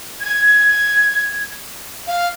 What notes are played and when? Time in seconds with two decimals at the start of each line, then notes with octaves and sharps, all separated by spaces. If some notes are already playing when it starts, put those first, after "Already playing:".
0.21 G#6
2.07 F5